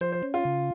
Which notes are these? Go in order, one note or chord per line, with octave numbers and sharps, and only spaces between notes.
F3 C5
C5
C#4
F4
C#3